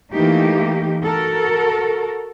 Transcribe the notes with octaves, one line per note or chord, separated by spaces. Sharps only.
E3 A3 A#3 D#4 G4
F#4 A4 A#4